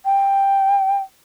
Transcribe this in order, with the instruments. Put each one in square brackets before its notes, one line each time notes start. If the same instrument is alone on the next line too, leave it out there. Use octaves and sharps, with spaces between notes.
[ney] G5